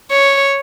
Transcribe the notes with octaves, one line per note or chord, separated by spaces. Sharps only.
C#5